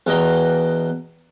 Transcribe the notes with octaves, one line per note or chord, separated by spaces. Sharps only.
E2 B2 D#5 G5 A#5